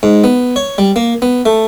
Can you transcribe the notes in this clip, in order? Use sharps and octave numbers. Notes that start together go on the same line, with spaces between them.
G#2
B3
C#5
G3
A#3
B3
A3